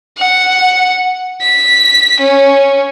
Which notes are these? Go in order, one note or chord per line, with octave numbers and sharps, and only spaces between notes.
F#5
B6
C#4